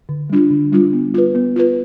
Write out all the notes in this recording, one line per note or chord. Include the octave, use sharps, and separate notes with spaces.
D3
G3 D4 F4
D3
G3 D4 F4
B3
F4 B4
B3
F4 B4